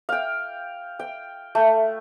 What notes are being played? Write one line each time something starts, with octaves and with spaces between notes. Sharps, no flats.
F5 G5
G5
A3